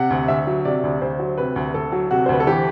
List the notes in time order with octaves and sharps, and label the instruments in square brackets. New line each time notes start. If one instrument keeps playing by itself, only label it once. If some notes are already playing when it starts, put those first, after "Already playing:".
Already playing: [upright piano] C3 F#5
D2
D2 E5
F#3
C3 D5
D2
D2 C5
F#3
C3 B4
D2
D2 A4
F#3
C3 F#4
C5
D2 B4
A4
E3 G4